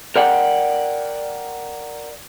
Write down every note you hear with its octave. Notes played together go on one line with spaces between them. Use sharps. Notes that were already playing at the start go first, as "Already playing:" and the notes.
A#4 D5 F#5 G5